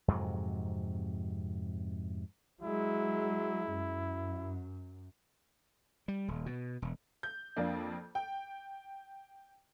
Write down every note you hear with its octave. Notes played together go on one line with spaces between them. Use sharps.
F2 G#2 C3 F#3
F#3 G#3 E4
F#2
G3
D#1
B2
E1
G6
F2 A#3 D4
G5